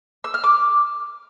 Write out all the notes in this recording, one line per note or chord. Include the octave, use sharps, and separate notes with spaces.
E6
F6
D6